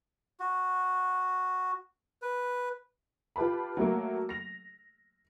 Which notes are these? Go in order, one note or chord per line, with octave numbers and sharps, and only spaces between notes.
F#4
B4
F4 G4 B4 A5 B5
F#3 A3 A#3
A#6 F7